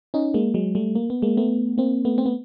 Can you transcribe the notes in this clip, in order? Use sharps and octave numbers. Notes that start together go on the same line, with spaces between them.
C#4 D#4
G#3 A#3
F#3 G#3
G3 A3
A#3
B3
G#3 A#3
A3 B3
A#3 C4
A3 B3
C4
B3